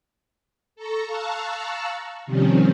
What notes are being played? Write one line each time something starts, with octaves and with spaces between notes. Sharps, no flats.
A4 A#5 C#6
F5 A5 A#5 C#6 E6 F#6
C3 D#3 F3 G3 C4 C#4